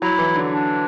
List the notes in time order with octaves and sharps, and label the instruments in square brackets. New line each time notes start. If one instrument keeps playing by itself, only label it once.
[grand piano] F#3 [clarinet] E4
[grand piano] E3
D3
[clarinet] D4